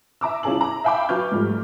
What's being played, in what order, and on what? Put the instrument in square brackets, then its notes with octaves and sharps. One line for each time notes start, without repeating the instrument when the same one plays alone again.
[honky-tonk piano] E5 A#5 D6 E6
C2 C#4 F4 G#4 A5 F#7
A#5
E5 F5 G5 B5 D6
F#3 B4 C#6 F6 G6
G#2 F3 G3 A3